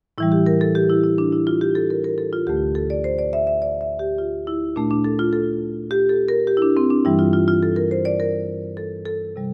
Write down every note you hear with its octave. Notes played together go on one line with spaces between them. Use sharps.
A2 E3 G3 E4
G4
A#4
A4
G4
E4
E4
D4
E4
F4
G4
A4
A#4
A#4
A4
F4
D2 D3 A3 G4
A4
D5
C5
D5
E5
E5
D5
E5
G4
F4
E4
A#2 A3 D4
D4
A4
F4
A4
G4
A4
A#4
G4
E4
D4
C4
D4
G2 E3 G3 E4
F4
F4
F4
A4
A#4
C5
D5
A#4
A4
A4
C3 G3